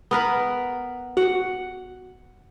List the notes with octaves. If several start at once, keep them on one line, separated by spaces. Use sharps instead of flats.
B3 A#4 B4
F#4 F#5